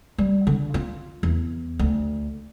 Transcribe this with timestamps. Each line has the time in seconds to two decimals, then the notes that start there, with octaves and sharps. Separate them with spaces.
0.18 G3
0.47 D3
0.74 F4
1.23 E2
1.79 D2